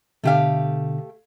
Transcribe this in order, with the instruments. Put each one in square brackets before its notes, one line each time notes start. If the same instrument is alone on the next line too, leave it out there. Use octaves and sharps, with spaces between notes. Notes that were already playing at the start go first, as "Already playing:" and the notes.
[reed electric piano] B2 D3 [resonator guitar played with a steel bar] A3 G4 F5